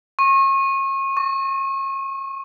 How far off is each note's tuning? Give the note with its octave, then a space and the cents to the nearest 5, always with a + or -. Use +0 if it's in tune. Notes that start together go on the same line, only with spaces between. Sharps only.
C#6 -35
C#6 +15